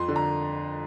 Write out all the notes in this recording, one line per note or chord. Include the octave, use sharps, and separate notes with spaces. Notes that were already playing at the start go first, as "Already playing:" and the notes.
Already playing: F2 C6
D3
A#5